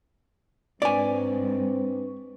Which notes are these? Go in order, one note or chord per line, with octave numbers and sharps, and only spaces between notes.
G#2 C4 D4 B4 D5 G#5 C#6